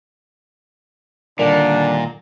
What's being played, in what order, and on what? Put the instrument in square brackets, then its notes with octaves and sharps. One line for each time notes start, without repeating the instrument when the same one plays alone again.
[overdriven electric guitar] A#2 [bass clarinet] D3 [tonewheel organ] D#3 G3 A#5 [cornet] D4